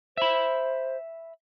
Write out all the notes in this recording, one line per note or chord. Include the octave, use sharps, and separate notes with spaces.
C5 E5 B5